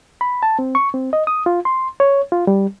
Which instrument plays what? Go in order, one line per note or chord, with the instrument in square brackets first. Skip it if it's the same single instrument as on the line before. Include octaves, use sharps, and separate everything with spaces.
[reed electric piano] B5
A5
C4
C#6
C4
D#5
D#6
F4
C6
C#5
F4
G3